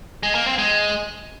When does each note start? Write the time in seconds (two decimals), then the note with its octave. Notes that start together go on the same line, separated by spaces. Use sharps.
0.23 G#3
0.35 A#3
0.46 C4
0.58 G#3